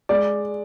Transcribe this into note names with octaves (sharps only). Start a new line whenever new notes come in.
G#3 D5